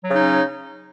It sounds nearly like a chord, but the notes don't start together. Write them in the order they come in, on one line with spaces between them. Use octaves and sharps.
F#3 C#3 D#4 C#4